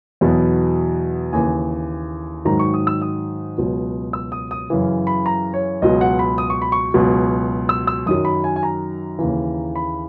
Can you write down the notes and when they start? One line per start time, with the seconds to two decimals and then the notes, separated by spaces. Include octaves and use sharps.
0.21 E2 B2 F#3
1.33 D#2 C#3 E3 G#5
2.45 G#2 D#3 F#3 A#5
2.59 C#6
2.74 D#6
2.87 E6
3.02 D#6
3.58 C#2 B2 F#3
4.13 E6
4.32 D#6
4.51 D#6
4.70 F#2 C#3 E3
5.07 B5
5.26 A#5
5.54 C#5
5.82 C#2 B2 F#3 D#5
6.01 F#5
6.19 B5
6.38 D#6
6.50 C#6
6.62 B5
6.72 C#6
6.94 C#2 B2 F#3
7.69 E6
7.87 E6
8.06 F#2 D#3 F#3 D#6
8.25 B5
8.44 G#5
8.56 G#5
8.63 A#5
9.19 D#2 C#3 E3
9.76 B5